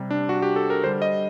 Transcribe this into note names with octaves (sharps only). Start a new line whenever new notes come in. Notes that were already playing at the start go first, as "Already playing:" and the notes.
Already playing: C3 G3
D4
F#4
G4
A4
A#4
D3 G3 C5
D#5